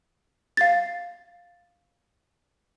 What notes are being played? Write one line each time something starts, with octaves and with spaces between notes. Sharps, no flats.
F5 A6